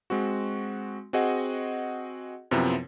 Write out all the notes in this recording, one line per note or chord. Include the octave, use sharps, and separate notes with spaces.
G#3 C4 F#4
C4 F#4 G#4 D#5 F#5
F#2 C3 F3 B3 C4 E4